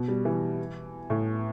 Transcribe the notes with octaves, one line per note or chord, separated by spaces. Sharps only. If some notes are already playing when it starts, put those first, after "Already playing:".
Already playing: B2
G3
E3
A2